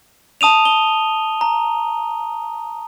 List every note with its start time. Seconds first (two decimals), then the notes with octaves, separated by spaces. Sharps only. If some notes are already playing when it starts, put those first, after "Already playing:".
0.41 A5 D#6 D#7 F7
0.65 G7
1.41 A#5